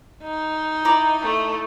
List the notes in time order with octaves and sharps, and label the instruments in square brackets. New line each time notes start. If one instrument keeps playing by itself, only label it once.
[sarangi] D#4
[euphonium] E4 [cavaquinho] D5 A#5 B5
[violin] A3